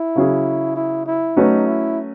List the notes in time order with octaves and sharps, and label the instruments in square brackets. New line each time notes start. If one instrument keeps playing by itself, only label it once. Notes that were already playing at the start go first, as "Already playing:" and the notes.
Already playing: [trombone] E4
[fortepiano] C#3 F#3 C#4 G#4
[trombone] E4
E4
[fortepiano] F#3 A3 C#4 F#4 B4 [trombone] D#4
[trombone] E4